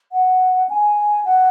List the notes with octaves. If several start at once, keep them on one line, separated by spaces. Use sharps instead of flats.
F#5
G#5
F#5